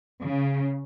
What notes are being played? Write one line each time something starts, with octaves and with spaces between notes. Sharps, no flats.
C#3